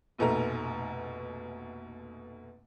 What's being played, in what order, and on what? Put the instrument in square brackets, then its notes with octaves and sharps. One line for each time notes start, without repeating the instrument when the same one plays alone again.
[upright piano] F1 A#1 B2 A3 D#4 A#5